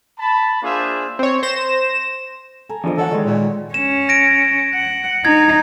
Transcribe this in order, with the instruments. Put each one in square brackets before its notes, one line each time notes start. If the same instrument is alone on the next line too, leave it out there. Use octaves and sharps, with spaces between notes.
[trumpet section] A5 B5
A#3 D4 F4 G#4 C5 E5
[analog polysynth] C4 C#5
C5 A#6 E7
[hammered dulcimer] A4 G#5 A#5
[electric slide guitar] E2 D3 F3 [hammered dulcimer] A#4 D#5
[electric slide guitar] E3 C#5 F#5 [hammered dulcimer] F#4 [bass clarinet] A4
[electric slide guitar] D#3 G#3 [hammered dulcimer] C#5 D5
[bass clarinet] A#2
[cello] C#4 [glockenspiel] E7
[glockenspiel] A#6 D7
[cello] F#5
[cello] D#4 [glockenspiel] G#6